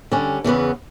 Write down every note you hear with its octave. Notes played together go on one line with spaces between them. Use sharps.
D3 G3 C#4
E2 C#3 E3 B3